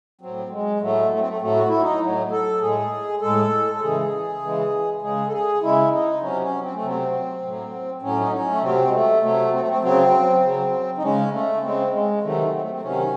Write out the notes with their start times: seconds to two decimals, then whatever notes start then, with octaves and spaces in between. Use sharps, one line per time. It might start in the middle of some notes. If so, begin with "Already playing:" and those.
0.21 A2 F#3 C4
0.51 G#3
0.81 A2 F#3 A3
1.11 A3
1.20 C4
1.28 A3
1.41 A2 F#3 A3
1.56 F#4
1.69 E4
1.82 D#4
2.01 A2 F#3
2.32 A4
2.61 A2 G#3 G#4
3.21 A2 G#3 A4
3.73 A4
3.81 C#3 E3 G#3 G#4
4.42 C#3 E3 G#3
5.02 C#3 G#3 G#4
5.28 A4
5.32 G#4
5.62 C#3 G#3 E4
5.92 D#4
6.22 C3 F#3 C#4
6.42 C#4
6.62 C4
6.74 A3
6.82 C3 F#3 C4
7.42 A2 F#3
8.02 A2 F#3 C#4
8.21 D#4
8.32 C#4
8.51 A3
8.62 C3 F#3 C4
8.88 G#3
8.93 A3
9.22 C3 F#3 A3
9.52 C4
9.60 A3
9.69 C4
9.82 C#3 F#3 C4
10.42 C#3 F#3
10.98 D#4
11.02 C#3 G#3 C#4
11.32 A3
11.62 C#3 G#3 C4
11.92 G#3
12.22 C3 D#3 F#3 A3
12.53 C4
12.61 A3
12.70 C4
12.82 C3 D#3 F#3 C#4